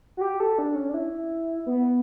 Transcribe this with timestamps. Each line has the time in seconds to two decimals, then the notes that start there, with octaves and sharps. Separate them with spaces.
0.17 F#4
0.21 G4
0.40 A4
0.58 D4
0.75 C#4
0.89 D4
0.94 E4
1.66 B3